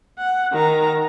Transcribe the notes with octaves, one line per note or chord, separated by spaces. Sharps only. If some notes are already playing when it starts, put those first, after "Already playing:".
F#5
D#3 A#5